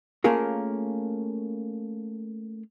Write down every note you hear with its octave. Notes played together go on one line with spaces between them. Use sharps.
A3 A#3 C#4 F4 G#4 A#4